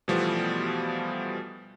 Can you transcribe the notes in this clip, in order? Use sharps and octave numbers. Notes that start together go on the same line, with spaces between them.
B2 E3 F3 G3 A3 B3